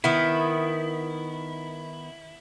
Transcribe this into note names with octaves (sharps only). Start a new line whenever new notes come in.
D#3 B3 E4